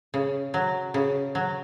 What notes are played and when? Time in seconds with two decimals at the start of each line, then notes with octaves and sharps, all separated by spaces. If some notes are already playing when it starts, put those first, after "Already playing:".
0.14 C#3
0.54 F#3
0.94 C#3
1.35 F#3